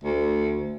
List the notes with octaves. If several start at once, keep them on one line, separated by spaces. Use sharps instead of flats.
D2